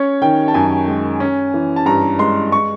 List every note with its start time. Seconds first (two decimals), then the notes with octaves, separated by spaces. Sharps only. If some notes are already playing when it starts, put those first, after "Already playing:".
Already playing: C#4 C#5
0.22 D#3 G5
0.48 A5
0.54 F#2 G#5
0.88 G#3
1.20 C#4
1.54 E3
1.76 A5
1.86 G2 A#5
2.19 G#3 C6
2.52 C#6